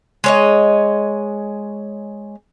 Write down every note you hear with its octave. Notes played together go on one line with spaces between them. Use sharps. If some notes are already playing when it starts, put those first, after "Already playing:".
G#3 C#5 D#5